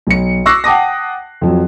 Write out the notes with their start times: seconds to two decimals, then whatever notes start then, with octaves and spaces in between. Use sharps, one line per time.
0.07 B1 C#7
0.46 C#6 D6 E6 F#6 A#6 C7
0.64 F#5 G5 A5 D6 D#6 A#6
1.42 F2 F3 F#3